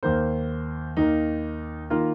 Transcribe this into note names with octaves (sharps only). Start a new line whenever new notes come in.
D#2 D#3 A#3 C5
D#2 D#3 A#3 D#4
D#3 A#3 F4